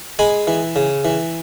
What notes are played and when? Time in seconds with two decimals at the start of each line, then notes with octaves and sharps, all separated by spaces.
0.19 G#3 G#5 B5
0.47 E3
0.76 C#3
1.05 E3